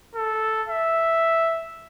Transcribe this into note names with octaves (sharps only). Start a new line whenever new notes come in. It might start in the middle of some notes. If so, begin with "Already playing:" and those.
A4
E5